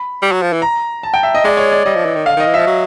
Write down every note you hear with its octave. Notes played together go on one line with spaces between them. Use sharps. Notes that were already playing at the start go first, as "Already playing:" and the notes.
Already playing: B5
G3
F#3
F3
E3
A#5
A5
G5
E5
D#5
G#3 D5
C#5
D5
G3 D#5
F3
E3
D#3
D3 F5
D#3 D#5
E3
F3 E5
F#3